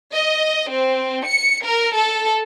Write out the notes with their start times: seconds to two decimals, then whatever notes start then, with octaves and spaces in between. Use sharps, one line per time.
0.13 D#5
0.69 C4
1.25 C#7
1.64 A#4
1.95 A4